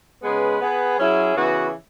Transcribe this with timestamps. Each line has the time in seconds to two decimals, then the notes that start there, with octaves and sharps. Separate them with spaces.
0.23 C#3 G#3 B3 G#4 B4
0.60 B3 G#4 B4
0.98 F#3 C#4 E4 G#4
1.35 C#3 E3 B3 F#4